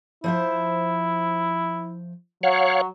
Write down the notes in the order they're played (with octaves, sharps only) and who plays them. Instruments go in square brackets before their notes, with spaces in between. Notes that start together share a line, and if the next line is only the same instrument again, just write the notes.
[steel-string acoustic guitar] F3 C5 E5 [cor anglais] E4
[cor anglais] F#3 [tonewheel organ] C#5 F5 F#5